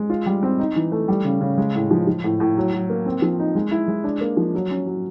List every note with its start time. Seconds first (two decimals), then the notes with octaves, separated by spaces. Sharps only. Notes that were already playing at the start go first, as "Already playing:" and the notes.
Already playing: G#3
0.10 F4
0.26 G3
0.43 C4
0.59 D#4
0.76 E3
0.92 A3
1.08 G3
1.25 C#3
1.41 C#3
1.58 G#3
1.75 A2
1.91 F3
2.07 F3
2.24 A2
2.40 A2
2.57 F#3
2.73 F#3
2.90 A#3
3.06 C4
3.22 F3
3.39 D#4
3.55 G#3
3.71 E4
3.88 G#3
4.04 D4
4.21 A#3
4.37 F3
4.54 F#3
4.71 C#4
4.87 F#3